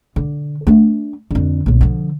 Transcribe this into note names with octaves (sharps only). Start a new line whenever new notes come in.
D3
A3 D4
F2 D3
B1 A#2
D3 F3